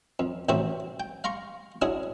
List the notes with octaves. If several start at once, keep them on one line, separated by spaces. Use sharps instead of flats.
F2
A1 C3 C4 C#4 F#4 E5
G5
F5 A#5 C6 C#6
G#3 C#4 D4 E4 F#4 G#4